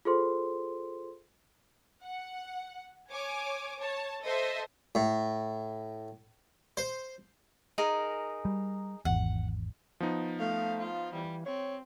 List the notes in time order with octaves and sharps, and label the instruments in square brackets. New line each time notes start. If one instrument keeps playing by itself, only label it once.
[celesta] F4 G#4 A4 C5 C6
[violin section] F#5
C#5 G#5 D6
C#5 A5
A4 C5 D#5 E5 A5 C6
[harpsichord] A2
C5
[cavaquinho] D#4 G#4 A#4
[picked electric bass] G3
[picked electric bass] G#1 E2 [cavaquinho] F#5
[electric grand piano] F3 B3 D#4
[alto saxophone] A3 [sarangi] F5
[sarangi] F4
[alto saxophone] E3 [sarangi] G3
[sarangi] C4 [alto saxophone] C#5